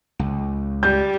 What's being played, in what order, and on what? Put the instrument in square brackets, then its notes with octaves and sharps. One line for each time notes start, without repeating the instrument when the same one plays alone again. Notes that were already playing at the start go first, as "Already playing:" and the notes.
[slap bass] C#2
[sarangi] G3 [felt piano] G6